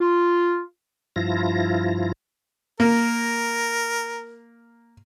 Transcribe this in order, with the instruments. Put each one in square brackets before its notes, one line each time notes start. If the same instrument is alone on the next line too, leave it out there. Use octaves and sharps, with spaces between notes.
[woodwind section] F4
[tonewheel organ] G2 F3 E4 F4 A#6
[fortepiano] A#3 [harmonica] A#4